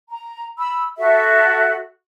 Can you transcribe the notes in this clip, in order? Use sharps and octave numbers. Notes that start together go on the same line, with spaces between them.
A#5
B5 E6
F#4 A4 E5